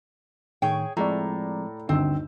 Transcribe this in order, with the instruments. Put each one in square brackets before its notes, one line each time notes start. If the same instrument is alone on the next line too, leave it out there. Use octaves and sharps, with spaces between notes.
[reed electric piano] A2 D#3 [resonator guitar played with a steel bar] G#4 C#5 G5
[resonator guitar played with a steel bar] A2 [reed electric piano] F3 G#3 C4 [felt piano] D5 A#5
[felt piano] G1 D2 [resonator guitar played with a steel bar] C4 [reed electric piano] D#4